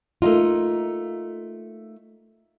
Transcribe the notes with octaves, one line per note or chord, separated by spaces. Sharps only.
A3 A#3 D#4 F4